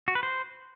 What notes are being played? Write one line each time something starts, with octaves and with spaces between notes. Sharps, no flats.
F#4
B4
C5